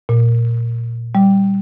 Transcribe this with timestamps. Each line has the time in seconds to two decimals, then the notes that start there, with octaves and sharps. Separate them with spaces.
0.09 A#2
1.15 G3